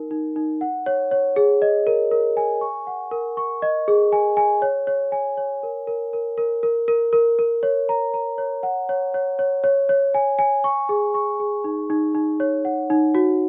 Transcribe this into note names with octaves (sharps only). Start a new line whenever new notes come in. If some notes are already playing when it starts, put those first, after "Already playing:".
Already playing: D#4 A#4
D#4
D#4
F#5
C#5
C#5
G#4
D#5
A#4
A#4
G#5
C#6
F#5
A#4
C#6
D#5
G#4
G#5
G#5
C#5
C#5
G#5
C#5
A#4
A#4
A#4
A#4
A#4
A#4
A#4
A#4
C#5
A#5
A#5
C#5
F#5
C#5
C#5
C#5
C#5
C#5
G#5
G#5
C#6
G#4
C#6
G#4
D#4
D#4
D#4
C#5
F#5
D#4
F#4